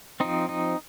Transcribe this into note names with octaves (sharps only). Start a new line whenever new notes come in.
F3 C4 D#4
D#4